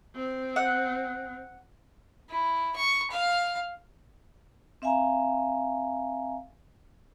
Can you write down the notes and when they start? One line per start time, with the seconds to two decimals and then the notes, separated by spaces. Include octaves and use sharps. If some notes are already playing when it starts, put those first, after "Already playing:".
0.15 C4
0.56 F#5
2.29 E4
2.76 C#6
3.10 F5
4.82 C4 E5 F5 G#5 A#5